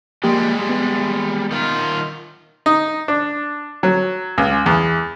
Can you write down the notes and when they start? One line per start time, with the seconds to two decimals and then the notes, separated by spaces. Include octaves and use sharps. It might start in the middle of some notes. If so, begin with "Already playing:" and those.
0.24 F3 G3 G#3 A#3 G4
0.69 B3
1.51 D#3 F4
2.66 D#4
3.08 D4
3.83 F#3
4.38 C#2
4.66 E2